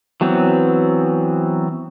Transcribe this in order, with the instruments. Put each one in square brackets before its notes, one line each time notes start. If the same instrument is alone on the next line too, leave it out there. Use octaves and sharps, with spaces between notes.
[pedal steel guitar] E3 F#3 B3 C4